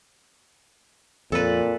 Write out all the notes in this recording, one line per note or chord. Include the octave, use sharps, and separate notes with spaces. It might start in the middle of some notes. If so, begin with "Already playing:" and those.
F2 A#2 A4 B4